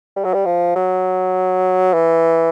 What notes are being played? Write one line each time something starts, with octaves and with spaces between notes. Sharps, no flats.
G3
F#3
G3
F3
F#3
E3